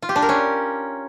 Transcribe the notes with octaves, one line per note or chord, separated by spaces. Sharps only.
F4
G4
D4
A#4
C#4